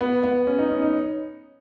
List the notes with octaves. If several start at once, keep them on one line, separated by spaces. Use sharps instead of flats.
B3
B3
C#4
D#4
C#4
D#4